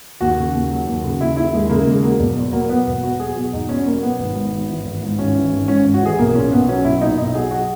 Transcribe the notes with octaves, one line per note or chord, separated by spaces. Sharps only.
D#2 F#4
C#3
D#2
F#3
D#2
C#3
D#2 E4
F#3 E4
D#2 G#3
C#3 A#3
D#2 G#3
F#3 A#3
E1
E2
F#3 A#3
B2 B3
E1
E2 F#4
F#3 G#4
B2 F#4
E1 D#4
E2 C#4
F#3 A#3
B2 B3
G#1
G#2
G#1
E3
G#1
G#2
G#1 C#4
E3
G#1
G#2 C#4
G#1
F#4
E3 G#4
B1 A#3
A#2 C#4
B1 B3
F#3 C#4
B1 E4
A#2 D#4
B1 D#4
F#3 G#4
F#4